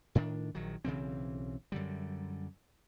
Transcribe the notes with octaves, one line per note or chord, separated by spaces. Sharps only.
A2 D#3 D4
A#1 D#3 F#3
B1 C#3 E3 C4
F#2 D3 G3